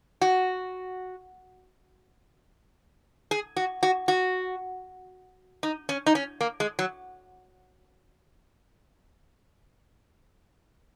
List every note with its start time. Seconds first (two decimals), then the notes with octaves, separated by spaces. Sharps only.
0.21 F#4
3.31 G#4
3.56 F#4
3.83 F#4
4.08 F#4
5.63 D#4
5.89 C#4
6.06 D#4
6.15 C#4
6.41 A#3
6.60 G#3
6.79 F#3